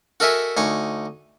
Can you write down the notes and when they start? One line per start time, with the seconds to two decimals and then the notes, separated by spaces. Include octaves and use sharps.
0.20 F#4 A4 A#4 D#5 E5 G#5
0.57 D2 D#4 G#5 C#6